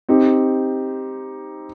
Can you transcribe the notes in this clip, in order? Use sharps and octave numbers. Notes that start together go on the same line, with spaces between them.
C4 D#4 G4